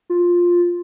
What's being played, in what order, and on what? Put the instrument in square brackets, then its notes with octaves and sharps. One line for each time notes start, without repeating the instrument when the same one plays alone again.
[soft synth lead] F4